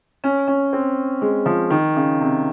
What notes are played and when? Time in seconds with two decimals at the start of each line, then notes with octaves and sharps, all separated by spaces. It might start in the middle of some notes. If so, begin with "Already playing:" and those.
0.24 C#4
0.47 C#4
0.73 C4
1.21 G#3
1.46 F3
1.70 D#3
1.96 C#3
2.20 C3